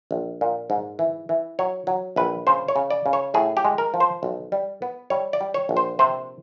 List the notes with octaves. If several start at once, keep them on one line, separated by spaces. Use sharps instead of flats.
A#1
A#2
G#2
E3
E3
F#3 C#5
F#3
A#1 B4
C#3 C5
C#5
C#3
D5
C#3
C#5
A2 G#4
G4
G#3
A#4
F3
C5
B1
G3
B3
G3 C#5
D5
G3
C#5
A#1
C5
C3 C5